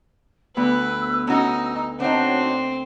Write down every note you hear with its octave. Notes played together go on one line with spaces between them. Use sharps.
D2 B3 B4 B5 E6
C#4 D#4 F#4
C4 D4 D#4 F#4 C#5 F#5